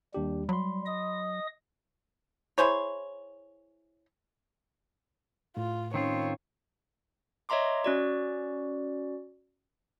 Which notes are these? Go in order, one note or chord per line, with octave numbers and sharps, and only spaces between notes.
D#2 G3 D4 G4
F#3 B5 C6
D#5 D#6
E4 G#4 C5 C#5
A2 F4
D#3 C4 C#4 D#4 F4 C#5
C#5 D#5 E5 A#5 C6 D6
C#4 F#4 D5